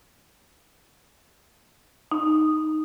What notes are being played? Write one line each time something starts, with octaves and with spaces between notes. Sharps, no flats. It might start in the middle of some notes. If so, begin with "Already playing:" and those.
D#4